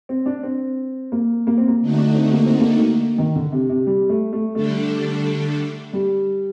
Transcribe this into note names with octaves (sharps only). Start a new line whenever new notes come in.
C4
D4
C4
A#3
A#3
C4
A#3
D3 A3 D#4 F#4
D4
C4
A#3
C4
A#3
D#3
D3
C3
C3
G3
A3
A3
D3 G3 A3 D4 A4
G3